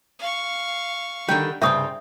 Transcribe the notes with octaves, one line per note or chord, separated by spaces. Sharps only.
F5 C#6
D3 D#3 G3 G5
C2 G2 C#3 F4 E5 G5 D#6